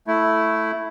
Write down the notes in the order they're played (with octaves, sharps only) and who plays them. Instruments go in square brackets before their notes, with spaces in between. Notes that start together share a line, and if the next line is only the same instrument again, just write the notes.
[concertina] A3 E4